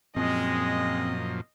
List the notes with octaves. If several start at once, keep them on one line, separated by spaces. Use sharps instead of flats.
F#2 A#2 F3 G#3 C4 D#5